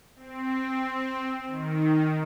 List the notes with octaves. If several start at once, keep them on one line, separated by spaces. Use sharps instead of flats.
C4
D#3